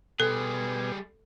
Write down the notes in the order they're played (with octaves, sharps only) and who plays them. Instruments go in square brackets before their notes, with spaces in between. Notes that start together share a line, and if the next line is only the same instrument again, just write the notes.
[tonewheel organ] B2 B4 G#5 [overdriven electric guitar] G3 G#4 [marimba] A4